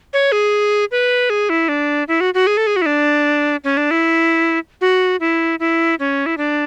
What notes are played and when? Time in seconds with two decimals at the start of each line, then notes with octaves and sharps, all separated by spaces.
0.13 C#5
0.32 G#4
0.91 B4
1.30 G#4
1.50 E4
1.69 D4
2.08 E4
2.21 F#4
2.34 F#4
2.47 G#4
2.57 A4
2.67 G#4
2.76 F#4
2.82 E4
2.86 D4
3.64 C#4
3.77 D4
3.91 E4
4.81 F#4
5.20 E4
5.60 E4
6.00 C#4
6.26 E4
6.37 D4